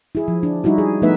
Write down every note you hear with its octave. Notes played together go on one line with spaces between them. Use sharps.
E4 G#4
F3
D4
G3 D#4 E4 F#4
G#4
F3 A3 B3 D#4 B4 E5